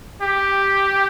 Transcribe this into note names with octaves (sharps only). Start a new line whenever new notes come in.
G4